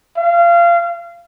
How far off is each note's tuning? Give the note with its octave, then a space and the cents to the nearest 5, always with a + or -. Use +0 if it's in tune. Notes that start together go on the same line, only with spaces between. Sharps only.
F5 -25